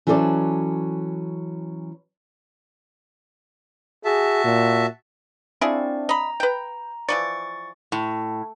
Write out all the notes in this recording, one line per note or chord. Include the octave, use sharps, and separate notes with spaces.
E3 F#3 C#4 A4 C5 D5
F#4 G#4 E5 A5
A#2
C4 D4 E4 F4 G#4 D5
D#5 A#5 B5
B4 G5
E3 F3 D5 C#6 A6 C#7
A2